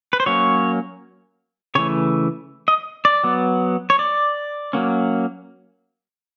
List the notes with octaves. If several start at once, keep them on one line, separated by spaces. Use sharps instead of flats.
B4
C5
F#3 A#3 C#4 C#5
C#3 E3 A3 C#5
D#5
D5
F#3 B3
C#5
D5
F#3 A#3 C#4